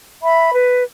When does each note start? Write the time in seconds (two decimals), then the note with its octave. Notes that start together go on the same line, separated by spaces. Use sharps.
0.22 E5 B5
0.53 B4